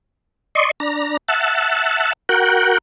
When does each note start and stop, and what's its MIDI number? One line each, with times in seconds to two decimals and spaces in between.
0.55 0.71 74
0.55 0.71 75
0.55 0.71 84
0.55 0.71 85
0.80 1.17 62
0.80 1.17 82
1.28 2.13 76
1.28 2.13 78
1.28 2.13 81
2.29 2.78 66
2.29 2.78 70
2.29 2.78 78
2.29 2.78 79